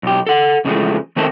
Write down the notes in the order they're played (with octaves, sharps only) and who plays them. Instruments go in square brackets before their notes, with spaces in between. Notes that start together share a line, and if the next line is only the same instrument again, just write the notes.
[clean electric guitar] B1 G4
A4 F#5
E2 C#3 F3 F#3 G#3 A3
D#3 A3 C4 A4 A#4 E5